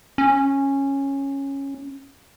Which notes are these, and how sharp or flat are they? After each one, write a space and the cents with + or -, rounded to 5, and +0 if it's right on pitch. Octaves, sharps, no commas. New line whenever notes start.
C#4 -10